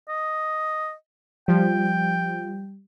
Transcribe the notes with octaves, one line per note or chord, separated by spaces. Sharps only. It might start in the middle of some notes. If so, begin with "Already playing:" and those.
D#5
F3 G3 G5